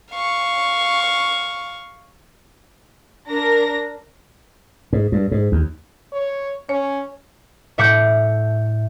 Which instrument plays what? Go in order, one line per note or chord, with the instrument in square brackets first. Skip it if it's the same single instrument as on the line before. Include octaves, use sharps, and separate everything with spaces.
[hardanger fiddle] F5 C#6
[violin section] D4 A#4 A#6
[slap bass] G#2
G2
G#2
D#2
[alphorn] C#5
[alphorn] C#4 [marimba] C#5
[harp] A2 E5 F#5 D6 F#6 G6